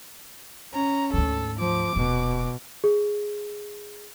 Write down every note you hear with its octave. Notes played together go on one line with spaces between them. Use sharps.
C#4 A#5
D2 G#2 A4
F3 D6
D#1 B2
G#4